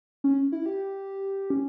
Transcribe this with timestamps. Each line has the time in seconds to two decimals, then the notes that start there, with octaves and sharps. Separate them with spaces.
0.24 C#4
0.52 E4
0.66 G4
1.50 C#4